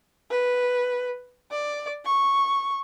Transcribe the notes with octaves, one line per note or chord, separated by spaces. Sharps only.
B4
D5
C#6